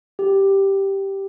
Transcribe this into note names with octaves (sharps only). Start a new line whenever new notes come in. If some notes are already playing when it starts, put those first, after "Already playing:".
G4